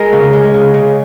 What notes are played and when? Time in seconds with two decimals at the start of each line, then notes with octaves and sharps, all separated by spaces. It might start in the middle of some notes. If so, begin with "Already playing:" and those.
Already playing: G#3 A#4
0.13 C#3
0.33 G#3
0.54 C#3
0.74 C#3